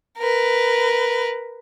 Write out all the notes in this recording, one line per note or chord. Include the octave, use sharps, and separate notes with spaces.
A#4 B4